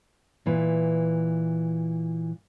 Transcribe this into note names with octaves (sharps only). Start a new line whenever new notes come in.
A#2 E3